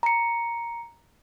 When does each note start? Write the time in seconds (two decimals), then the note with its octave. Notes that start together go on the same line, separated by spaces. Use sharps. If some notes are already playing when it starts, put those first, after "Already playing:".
0.03 A#5 C#7